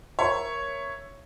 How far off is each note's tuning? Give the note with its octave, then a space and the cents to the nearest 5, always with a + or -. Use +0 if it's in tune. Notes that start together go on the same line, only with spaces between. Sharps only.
A#4 +15 C#5 +0 E5 +10